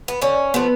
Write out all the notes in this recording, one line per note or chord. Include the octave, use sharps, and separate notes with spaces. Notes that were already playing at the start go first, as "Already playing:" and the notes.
B3
D3 C#4
F3 A3 B3